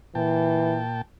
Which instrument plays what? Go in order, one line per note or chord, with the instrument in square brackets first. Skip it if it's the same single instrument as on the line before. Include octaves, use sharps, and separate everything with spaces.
[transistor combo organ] A#2 G5 A5 [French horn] E3